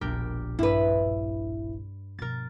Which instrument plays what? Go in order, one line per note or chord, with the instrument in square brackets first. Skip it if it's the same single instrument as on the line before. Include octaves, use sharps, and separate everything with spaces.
[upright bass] E1 A#1 [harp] D4 G4 A#4
[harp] G2 [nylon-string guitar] E4 B4
[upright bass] B2 F3 [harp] A#4 A6